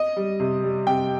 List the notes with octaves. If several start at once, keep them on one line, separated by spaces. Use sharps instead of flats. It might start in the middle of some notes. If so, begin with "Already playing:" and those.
Already playing: D#5
G3
C3
G3
C3 G5